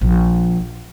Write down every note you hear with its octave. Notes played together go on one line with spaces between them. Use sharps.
A#1